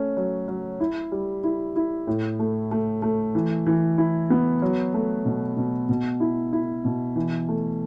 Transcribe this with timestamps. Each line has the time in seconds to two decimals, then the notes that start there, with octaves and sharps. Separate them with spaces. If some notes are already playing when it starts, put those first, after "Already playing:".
Already playing: A3 C#4
0.17 F#3
0.48 F#3
0.80 E4
1.12 G3
1.44 E4
1.76 E4
2.07 A2
2.39 A3
2.71 A3
3.02 A3
3.35 E3
3.66 E3
3.98 E4
4.30 B3
4.62 F#3
4.94 A3
5.25 B2
5.57 B2
5.89 B2
6.20 E4
6.53 E4
6.85 B2
7.16 E3
7.49 A3